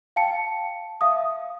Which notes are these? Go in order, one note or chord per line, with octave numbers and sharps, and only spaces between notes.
F5 G5 A5 C#7
E5 F5 D#6